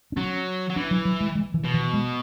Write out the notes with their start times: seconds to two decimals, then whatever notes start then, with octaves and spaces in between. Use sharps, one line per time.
0.12 D4
0.16 F#3 C#4
0.70 F#3
0.76 E3 D4
0.91 F#3
1.05 F#3
1.20 G#3
1.35 G#3
1.54 E3
1.64 B2
1.74 E3
1.93 G#3